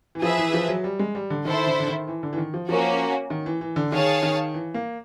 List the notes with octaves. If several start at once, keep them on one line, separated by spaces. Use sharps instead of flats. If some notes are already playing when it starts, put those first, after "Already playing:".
E3
F3 G#4 B4 E5
E3
F3
F#3
G3
G#3
G3
D3
D#3 E4 A4 C5
D3
D3
D#3
E3
D3
E3
D#3
F3
F3 A#3 C#4 F#4
D#3
E3
E3
D3
D#3 G#4 C#5 F5 A5
D#3
E3
A#3